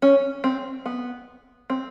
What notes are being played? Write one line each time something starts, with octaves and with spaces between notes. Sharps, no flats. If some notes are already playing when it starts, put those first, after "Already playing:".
C#4
C4
B3
C4